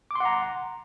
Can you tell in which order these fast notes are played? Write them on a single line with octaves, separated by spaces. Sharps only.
D6 C6 F#5 A#5